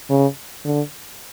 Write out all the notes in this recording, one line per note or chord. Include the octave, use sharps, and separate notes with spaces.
C#3
D3